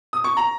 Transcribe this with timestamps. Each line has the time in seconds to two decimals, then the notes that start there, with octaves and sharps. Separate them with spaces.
0.13 D#6
0.24 C#6
0.37 A#5